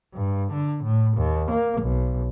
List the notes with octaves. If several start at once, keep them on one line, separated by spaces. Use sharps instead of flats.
G2
D3
A2
D#2
A#3
B1